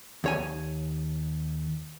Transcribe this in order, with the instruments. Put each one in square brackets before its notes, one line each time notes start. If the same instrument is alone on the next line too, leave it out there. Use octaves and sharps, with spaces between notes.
[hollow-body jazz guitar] D#2 C#5 G#5